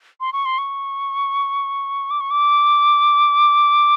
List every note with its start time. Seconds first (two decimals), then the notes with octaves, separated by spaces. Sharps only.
0.21 C6
0.33 C#6
0.45 C6
0.58 C#6
2.11 D6
2.20 C#6
2.31 D6